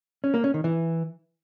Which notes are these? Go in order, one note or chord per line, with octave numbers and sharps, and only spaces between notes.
C#4
A#3
C#4
D#3
E3